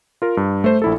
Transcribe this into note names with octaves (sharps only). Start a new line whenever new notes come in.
F4 A#4
G2
A3 C5
A#1 E4 A4